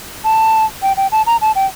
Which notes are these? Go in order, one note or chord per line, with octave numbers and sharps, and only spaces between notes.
A5
G5
G5
A5
A#5
A5
G5